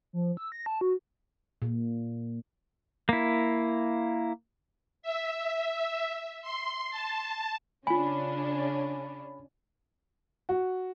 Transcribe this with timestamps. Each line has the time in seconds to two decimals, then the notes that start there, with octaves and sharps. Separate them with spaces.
0.13 F3
0.37 E6
0.52 A#6
0.66 A5
0.81 F#4
1.62 A#2
3.09 A#3 E4
5.02 E5
6.42 C6
6.90 A5
7.87 C#3 C#4 D4 F4 G#5 B5
10.49 F#4